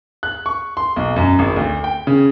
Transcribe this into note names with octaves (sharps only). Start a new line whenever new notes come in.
F#6
C#6
C6
B1
F#2
G#1
D2
G5
C#3